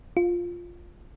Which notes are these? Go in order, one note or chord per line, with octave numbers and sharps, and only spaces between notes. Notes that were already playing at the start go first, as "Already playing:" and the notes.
F4